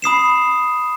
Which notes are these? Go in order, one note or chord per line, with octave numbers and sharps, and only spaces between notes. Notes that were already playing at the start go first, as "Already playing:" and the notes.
B5 D#6 C7 E7